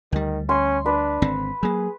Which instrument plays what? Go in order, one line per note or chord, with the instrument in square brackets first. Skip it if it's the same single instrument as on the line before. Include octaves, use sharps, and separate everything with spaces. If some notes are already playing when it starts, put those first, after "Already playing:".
[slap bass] D2 G3 [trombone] D#3
[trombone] C#4 [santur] C6
[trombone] D4 [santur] B4
[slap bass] G#1 D3 C4
[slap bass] F#3 A#3 [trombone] G#4